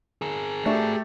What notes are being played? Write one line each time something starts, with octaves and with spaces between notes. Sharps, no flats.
G#4 A#4
A3 D4 F#4 G4 A4 E5